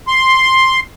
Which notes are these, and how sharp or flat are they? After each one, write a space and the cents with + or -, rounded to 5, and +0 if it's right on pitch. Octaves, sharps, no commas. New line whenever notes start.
C6 +5